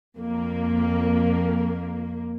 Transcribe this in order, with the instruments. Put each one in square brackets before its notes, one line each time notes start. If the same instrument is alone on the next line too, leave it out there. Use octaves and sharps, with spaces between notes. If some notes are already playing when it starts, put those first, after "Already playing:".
[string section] F2 A#3